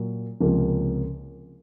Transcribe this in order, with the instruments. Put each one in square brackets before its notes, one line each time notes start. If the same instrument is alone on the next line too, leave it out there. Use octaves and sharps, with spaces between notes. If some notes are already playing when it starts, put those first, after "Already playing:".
Already playing: [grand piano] A#2 F#3
C#2 C3 F3 A#3 C#4